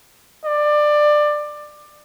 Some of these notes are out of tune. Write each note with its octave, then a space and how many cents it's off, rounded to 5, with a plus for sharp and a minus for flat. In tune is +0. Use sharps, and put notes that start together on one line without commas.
D5 +20